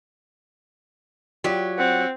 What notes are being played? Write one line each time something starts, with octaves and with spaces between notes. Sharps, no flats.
F#3 F4 G4 D5 G5
C4 F#5